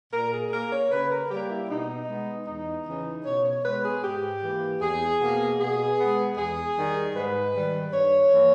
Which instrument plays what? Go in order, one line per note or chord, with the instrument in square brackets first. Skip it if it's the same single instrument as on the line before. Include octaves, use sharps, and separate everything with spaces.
[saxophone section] A#2 A#4
G#4
A#3 A#4
C#5
C#3 B4
A#4
G3 G4
A#3
E4
B2 D#4
G#3 B3
E2 D#4
C#3 E3
B2 C#5
C#5
G#3 B3 B4
G#4
G#2 G4
E3 A#3
E2 G#4
B2 A#3
B2 G#4
G#3 B3
E2 G#4
D#3 G3
G#2 B4
D#3 G3
G2 C#5
E3 A#3